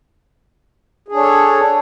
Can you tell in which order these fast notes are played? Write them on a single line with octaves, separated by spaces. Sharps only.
G#4 D4 C#5 A4